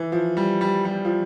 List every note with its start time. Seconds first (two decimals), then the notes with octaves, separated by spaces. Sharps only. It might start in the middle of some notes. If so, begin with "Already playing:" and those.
Already playing: E3
0.12 F3
0.37 G3
0.61 G3
0.85 G3
1.05 F3